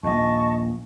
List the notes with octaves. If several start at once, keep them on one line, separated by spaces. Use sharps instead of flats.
A#1 D#2 D#5 A5 C#6